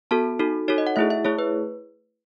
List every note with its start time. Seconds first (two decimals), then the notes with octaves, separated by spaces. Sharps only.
0.11 B3 F#4 A4 A5
0.39 D#4 F#4 A4
0.68 D#4 F#4 A4 C#5
0.78 D#5
0.87 F#5
0.96 A3 E4 G#4 E5
1.10 E5
1.25 A3 E4 G#4 C#5
1.39 B4